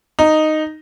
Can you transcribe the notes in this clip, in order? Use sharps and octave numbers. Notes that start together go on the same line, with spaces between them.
D#4